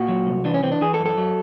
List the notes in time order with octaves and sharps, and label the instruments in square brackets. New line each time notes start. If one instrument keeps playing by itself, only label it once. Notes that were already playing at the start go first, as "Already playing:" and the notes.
Already playing: [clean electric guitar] A#2 F#4
F#3
C2
E3 D4
C#4
E3 C4
D4
E3 G#4
A4
F#2
A4
F#3